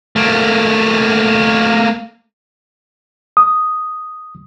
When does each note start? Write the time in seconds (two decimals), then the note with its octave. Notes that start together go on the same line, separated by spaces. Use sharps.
0.16 A3 A#3
3.37 D#6